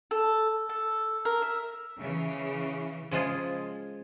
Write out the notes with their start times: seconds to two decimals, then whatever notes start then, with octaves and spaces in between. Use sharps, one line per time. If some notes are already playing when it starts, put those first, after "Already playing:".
0.11 A4
0.69 A4
1.25 A#4
1.42 E5
1.97 C#3 E3
3.11 C#3 F3 G#3 F4 G#4